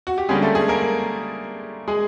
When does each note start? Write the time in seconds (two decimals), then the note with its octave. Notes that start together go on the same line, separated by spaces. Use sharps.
0.07 F#4
0.18 G4
0.29 D3 G3 G#3 A#3 C#4 G#4
0.42 A3 A4
0.55 G#3 G#4
0.68 A#3 A#4
1.88 G#3 G#4